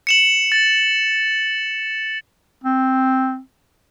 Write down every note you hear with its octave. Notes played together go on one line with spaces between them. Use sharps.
C#7 E7 F#7
A6
C4